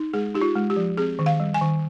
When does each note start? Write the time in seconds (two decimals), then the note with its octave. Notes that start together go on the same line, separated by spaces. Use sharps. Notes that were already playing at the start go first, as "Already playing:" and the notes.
Already playing: D#4
0.13 G#3 G#4
0.34 D#4 G4
0.41 F4
0.55 G#3
0.70 G4
0.76 F3
0.97 C4 G#4
1.19 D#3
1.26 F5
1.40 G3
1.54 G#5
1.61 D#3